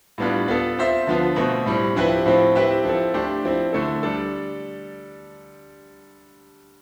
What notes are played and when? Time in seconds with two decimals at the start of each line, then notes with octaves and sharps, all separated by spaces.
0.18 A2 G3 B3 D4 F4
0.48 B3 F4 A4
0.78 C4 F4 C5 E5
1.07 D3 F3 B3 F4
1.36 B2 A3 C4
1.66 A2 G3 C4
1.96 F3 C4 E4 G4 B4
2.26 A2 F3 C4 F4
2.55 C4 E4 G4 B4 E5
2.84 F3 C4 E4 A4
3.14 A3 D4 G4 C5
3.44 F3 C4 E4
3.73 D3 A3 E4 A4
4.03 G3 D4 A4